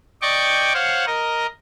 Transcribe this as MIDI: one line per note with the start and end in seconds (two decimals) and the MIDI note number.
0.22 0.73 74
0.22 0.73 75
0.22 0.73 79
0.22 0.73 85
0.22 0.73 86
0.74 1.05 72
0.74 1.05 73
0.74 1.05 77
0.74 1.05 78
1.07 1.46 70
1.07 1.46 75